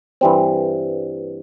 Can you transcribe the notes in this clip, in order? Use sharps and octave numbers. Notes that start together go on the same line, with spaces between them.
G2 E3 G3 C4